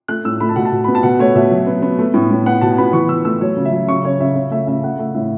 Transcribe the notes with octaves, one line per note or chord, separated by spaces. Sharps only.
A3 F#6
A2 E6
A3 B5
A5
B2 F#5
A5
B2
B3 B5
A5
B2 F#5
A3 C#5
B2 E5
F#3
B3
B3
A3
A2
A2
B3 F#5
B2 A5
B3 B5
E3 C#6
E3 E6
A3 E6
F#3 C#5
C#3
E5
F#3
C#3 C#6
C#3 C#5
C#3 E5
C#3
A3 E5
C#3 E5
A3 F#5
A3 E5
A2 E5